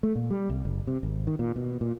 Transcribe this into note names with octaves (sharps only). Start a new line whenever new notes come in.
A3
A#2
G3
C2
F#1
C3
G#1
D#3
A#2
B2
A#2